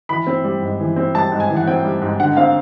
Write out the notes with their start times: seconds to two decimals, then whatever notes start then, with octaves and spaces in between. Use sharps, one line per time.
0.09 E3 B5
0.27 C4
0.44 G3
0.62 G#2
0.80 E3
0.96 C4
1.15 G3 A5
1.32 G#2
1.40 G#5
1.50 E3
1.57 F#5
1.67 C4 G5
1.84 G3
2.02 G#2
2.20 D3 F#5
2.37 C4 F5